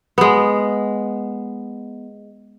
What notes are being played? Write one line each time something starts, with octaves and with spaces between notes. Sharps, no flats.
G#3 B3